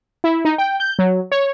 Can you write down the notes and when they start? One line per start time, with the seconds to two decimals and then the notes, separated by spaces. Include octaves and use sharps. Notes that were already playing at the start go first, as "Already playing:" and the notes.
0.24 E4
0.45 D#4
0.58 G5
0.80 G6
0.99 F#3
1.32 C#5